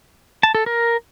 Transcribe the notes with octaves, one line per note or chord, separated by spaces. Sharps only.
A5
A4
A#4